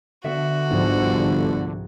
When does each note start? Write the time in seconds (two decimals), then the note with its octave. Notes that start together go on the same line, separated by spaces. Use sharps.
0.24 D3 B3 F#4 E5
0.70 G1 C2 G#2 F3